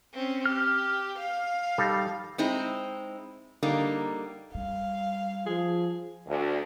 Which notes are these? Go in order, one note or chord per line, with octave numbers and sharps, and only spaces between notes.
C4 C#4
G4 F6
F5
G3 D#4 A4
G#3 C4 D#4 E4
D3 G3 A#3 D#4
G3 F5
F3 G#4
D2